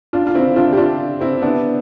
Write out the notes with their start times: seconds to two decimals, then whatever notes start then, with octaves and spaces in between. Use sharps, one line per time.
0.13 D4 F4
0.27 F4
0.35 C4 E4
0.56 D4 F4
0.72 G4
0.77 D4 F4
1.21 C4 E4
1.42 B3 D4